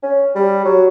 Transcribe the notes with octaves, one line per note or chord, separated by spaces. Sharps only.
C#4
G3
F#3